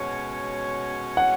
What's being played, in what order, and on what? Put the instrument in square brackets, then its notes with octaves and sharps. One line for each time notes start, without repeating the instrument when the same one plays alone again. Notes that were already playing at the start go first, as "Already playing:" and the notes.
Already playing: [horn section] B2 G#3 C#4 F#4 C#5
[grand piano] F#5